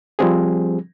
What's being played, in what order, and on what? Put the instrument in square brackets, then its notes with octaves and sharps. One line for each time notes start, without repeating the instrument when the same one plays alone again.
[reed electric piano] F3 G3 C4 G#4